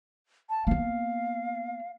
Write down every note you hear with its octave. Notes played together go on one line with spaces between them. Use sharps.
A5
A#3 B3 F5